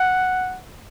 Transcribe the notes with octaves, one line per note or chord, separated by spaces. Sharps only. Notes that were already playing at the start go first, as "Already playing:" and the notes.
Already playing: F#5